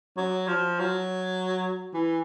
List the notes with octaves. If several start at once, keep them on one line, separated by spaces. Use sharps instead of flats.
F#3
F3
F#3
E3